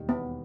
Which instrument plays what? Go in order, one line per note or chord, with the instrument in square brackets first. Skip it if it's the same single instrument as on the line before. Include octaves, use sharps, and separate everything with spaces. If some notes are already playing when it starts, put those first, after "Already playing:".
Already playing: [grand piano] E1 D#2 D#3 G3 D#4
[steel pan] B3